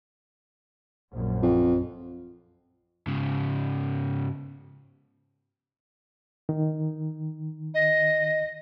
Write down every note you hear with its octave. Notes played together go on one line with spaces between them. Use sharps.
A#1 F#2
F2
G#2 C#3
D#3
D#5